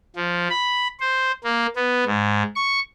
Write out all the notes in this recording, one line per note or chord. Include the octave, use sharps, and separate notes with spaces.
F3
B5
C5
A#3
B3
G#2
C#6